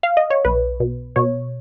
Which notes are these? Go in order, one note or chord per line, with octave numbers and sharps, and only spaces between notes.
F5
D#5
C#5
B1 B4
B2
B2 C#5